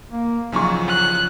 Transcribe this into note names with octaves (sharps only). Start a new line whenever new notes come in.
A#3
B1 E2 C#3 F3 F#3 A#5 C#6
F#6